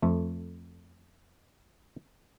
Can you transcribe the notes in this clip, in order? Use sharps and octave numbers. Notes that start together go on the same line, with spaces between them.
F2 A3